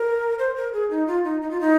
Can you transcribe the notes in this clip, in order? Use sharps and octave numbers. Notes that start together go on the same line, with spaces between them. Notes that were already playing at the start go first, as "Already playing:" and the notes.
Already playing: A#4
C5
A#4
G#4
D#4
F4
D#4
D#4
F4
D#4